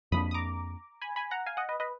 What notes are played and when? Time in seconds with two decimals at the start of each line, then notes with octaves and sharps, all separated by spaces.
0.12 F2 F3 A#3 D4 B5 D#6
0.31 D#6
0.34 A#5 D6
1.01 G#5 B5
1.16 G#5 B5
1.31 F#5 A#5
1.46 F5 G#5
1.57 D#5 F#5
1.69 B4 D#5
1.80 B4 D#5